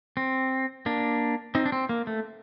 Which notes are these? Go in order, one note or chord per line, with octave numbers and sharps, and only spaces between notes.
C4
A#3 D4
C4 D#4
D4
C4
A#3
A3